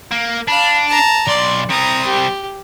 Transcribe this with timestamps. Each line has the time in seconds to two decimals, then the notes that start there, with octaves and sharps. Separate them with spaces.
0.11 A#3
0.48 D4 F5 B5
0.88 A5 A#5
1.27 B1 D5 C6
1.70 G3 C4 A#5 D#6
2.05 G4